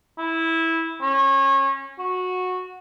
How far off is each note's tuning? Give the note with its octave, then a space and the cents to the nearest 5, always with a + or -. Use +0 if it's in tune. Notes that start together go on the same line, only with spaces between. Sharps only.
E4 -10
C#4 -25
F#4 -15